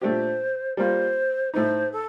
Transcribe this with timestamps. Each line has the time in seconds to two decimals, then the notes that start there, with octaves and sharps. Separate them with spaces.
0.02 A#2 A3 D4 G4 C5
0.77 G3 A#3 F4 C5
1.54 A2 A3 D#4 C5
1.92 A4